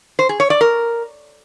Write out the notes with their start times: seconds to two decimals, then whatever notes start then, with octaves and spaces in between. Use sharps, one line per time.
0.19 C5
0.29 G#4
0.40 C#5
0.50 D5
0.61 A#4